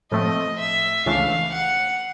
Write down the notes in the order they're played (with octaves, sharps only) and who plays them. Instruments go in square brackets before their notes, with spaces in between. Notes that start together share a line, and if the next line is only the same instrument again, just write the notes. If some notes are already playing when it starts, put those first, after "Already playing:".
[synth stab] A2 F3 A3 C4 [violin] D#5
[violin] E5
[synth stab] C#2 C#3 E3 A3 D4 [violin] F5
[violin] F#5